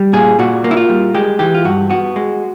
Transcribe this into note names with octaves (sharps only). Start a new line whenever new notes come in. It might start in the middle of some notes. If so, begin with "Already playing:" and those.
Already playing: G3
A#2 G#4
A#2 F#4
A#3
E4
F4
G3
G#3 G4
E3 G4
F4
G2 F#4
B3 F#4
G#3